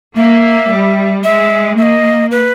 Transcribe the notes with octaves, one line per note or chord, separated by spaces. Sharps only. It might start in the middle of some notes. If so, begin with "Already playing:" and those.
A#3 E5
G3
G#3 E5
A#3 E5
D#5
B4